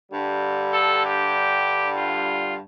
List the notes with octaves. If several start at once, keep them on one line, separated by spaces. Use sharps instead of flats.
G2 D3 G3
A4
G4
F4